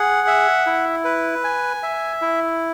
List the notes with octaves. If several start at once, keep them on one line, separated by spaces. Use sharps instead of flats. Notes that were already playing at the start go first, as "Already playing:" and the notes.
Already playing: G#4 F#5
E5
E4
B4
G#5
E5
E4